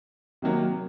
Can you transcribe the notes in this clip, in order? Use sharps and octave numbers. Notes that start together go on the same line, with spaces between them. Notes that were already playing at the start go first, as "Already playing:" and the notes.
C3 D#3 F#3 A#3